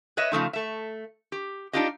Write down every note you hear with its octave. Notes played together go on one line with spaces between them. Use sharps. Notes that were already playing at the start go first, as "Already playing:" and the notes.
B4 C#5 D#5 E5
C#3 F3 A3 D#4
A3 E5
G4
D4 D#4 F4 G4 D#5